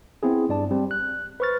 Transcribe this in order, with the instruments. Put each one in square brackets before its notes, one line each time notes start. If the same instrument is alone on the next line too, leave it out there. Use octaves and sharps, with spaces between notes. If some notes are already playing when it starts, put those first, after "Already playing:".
[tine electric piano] B3 C4 E4 G#4
G2 D5 A5
G3 C4
F#6
B4 C5 C#6 F6 A6